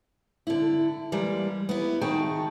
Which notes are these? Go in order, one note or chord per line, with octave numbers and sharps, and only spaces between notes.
D3 E4
E3 G3 G#3 A#3
B3 E4
D#3 F#4 G#4 G5 A5